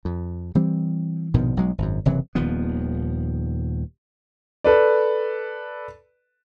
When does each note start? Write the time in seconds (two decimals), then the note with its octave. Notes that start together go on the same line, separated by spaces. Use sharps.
0.05 F2
0.55 E3 G3 C4
1.34 A#1 G#2 B2 D#3
1.57 B1 F#3 G#3
1.78 G#1 F#2
2.05 F#1 C3 E3 F#3
2.35 D#1 D#2 F3 B3
4.64 A4 B4 D5